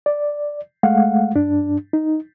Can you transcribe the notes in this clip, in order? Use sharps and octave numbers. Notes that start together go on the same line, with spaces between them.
D5
G#3 A3 F5 F#5
G2 D4
D#4